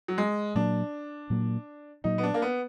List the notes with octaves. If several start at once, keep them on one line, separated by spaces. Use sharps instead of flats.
F#3
G#3
A#2 F#3 A#3 D4
A#2 F#3 A#3
A#2 F#3 A#3 D#4
B3
D4
A#3
B3